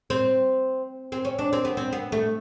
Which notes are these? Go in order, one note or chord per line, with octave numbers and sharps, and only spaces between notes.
C4
C4
C#4
D4
C4
B3
C4
B3
A3